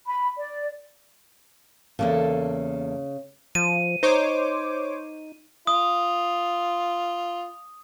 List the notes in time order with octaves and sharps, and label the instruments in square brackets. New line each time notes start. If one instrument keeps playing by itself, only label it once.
[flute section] B5
D5
[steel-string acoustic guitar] E2 A#3 A4 [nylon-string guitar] C#3
[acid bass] F3 [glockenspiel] D#7
[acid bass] D#4 [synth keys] C5 C#5 D6
[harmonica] F4 [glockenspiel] D#6